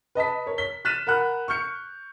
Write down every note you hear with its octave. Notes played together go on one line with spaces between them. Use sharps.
B4 D#5 A5 B6
A#4 C#5
B6 G7
F6 F#6 A6 B6 D#7 E7
A#4 F#5 B5 F#6
C#6 F6 G6 C#7